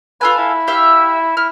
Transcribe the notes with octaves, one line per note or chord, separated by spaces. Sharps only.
F4 A4 B4 G#5
E4
G4 E5 F5
E4 F6